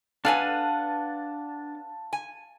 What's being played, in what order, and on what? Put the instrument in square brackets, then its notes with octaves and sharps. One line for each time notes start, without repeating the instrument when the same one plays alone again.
[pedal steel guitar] D4 F#5 [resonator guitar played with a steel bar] A4 B4 G#5 [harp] F5 [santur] A5
[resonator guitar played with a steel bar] G#5